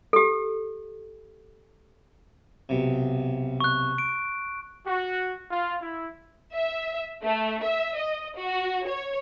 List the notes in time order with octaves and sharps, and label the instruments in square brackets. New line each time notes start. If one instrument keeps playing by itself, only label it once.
[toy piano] G4 A4
[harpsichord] B1 C3
[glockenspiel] C#6 F#6
D7
[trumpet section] F#4
F4
E4
[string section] E5
A3
E5
D#5
F#4
C#5